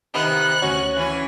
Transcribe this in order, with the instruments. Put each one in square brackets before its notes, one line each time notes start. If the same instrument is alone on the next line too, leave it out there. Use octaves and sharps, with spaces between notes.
[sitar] C3 D#3 B3 [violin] F#6
[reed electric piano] D2 C#5 [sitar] C#4 F#4
[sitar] E3 C#4